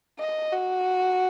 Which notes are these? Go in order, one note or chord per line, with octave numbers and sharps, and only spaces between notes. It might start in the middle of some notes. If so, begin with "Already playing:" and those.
D#5
F#4